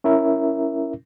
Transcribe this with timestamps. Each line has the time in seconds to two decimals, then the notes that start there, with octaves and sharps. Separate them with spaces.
0.04 C#4 E4 A#4 E5